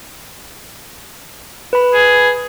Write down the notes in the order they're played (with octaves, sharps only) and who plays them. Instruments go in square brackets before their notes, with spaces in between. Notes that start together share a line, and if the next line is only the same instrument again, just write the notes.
[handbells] B4 B5
[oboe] G#4